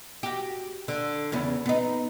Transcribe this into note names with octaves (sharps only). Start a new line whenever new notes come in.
F#4 G4
D3
E2 C#3 B3
B3 D#4